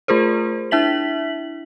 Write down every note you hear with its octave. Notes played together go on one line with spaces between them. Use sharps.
A3 F4 G#4 A#4 C5
D4 E4 E5 B6 F#7